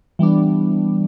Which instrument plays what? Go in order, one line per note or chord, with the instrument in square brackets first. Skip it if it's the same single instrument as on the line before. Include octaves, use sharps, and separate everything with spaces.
[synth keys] E3 G3 B3 D4